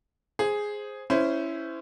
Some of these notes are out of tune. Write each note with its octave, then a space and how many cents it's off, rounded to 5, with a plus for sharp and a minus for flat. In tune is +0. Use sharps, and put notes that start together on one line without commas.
G#4 +0 C5 +0
C#4 +0 E4 +0 C5 -20